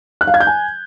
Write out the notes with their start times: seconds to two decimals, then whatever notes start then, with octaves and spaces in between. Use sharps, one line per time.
0.21 F#6
0.27 F5
0.34 G#6
0.40 G6
0.47 G#5